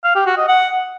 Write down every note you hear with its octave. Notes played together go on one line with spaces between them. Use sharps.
F5
G4
F#4
D#5
F#5